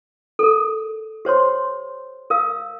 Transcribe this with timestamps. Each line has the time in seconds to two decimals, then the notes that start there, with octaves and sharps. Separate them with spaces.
0.39 A4 A#4
1.25 G4 C5 C#5 C6
2.30 A#4 F5 E6